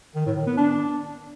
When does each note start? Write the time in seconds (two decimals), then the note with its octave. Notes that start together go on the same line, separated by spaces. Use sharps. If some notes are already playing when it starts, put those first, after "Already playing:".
0.15 D#3
0.26 A2
0.36 D#3
0.47 B3
0.57 D4